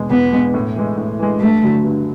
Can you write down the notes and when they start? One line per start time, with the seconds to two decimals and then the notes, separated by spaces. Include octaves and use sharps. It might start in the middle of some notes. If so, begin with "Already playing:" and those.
Already playing: E2 B2 G#3
0.10 E2 B3
0.33 B2 G#3
0.54 A2
0.76 E3 G#3
0.97 A2
1.19 E3 G#3
1.40 G2 A3
1.63 D3 F#3
1.84 G2